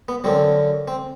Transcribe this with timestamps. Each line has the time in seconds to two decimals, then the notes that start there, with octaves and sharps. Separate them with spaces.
0.08 B3
0.24 F#2 D3 F#3 C4
0.88 C4